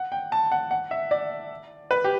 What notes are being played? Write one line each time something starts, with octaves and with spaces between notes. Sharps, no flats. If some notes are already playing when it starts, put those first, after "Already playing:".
Already playing: F#5
G5
A5
F#5
F#5
E5
D5
B4
G4